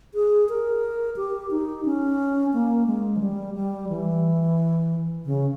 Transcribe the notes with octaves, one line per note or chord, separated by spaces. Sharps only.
G#4
A#4
G4
D#4
C#4
A#3
G#3
E3
G3
G3
E3
C#3